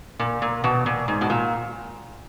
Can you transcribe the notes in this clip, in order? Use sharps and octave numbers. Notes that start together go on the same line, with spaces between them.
A#2
A#2
B2
A#2
G#2
B2
A#2